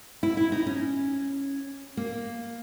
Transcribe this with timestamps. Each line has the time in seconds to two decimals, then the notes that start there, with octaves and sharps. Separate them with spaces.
0.23 E4
0.37 E4
0.52 D#4
0.67 C#4
1.97 A#3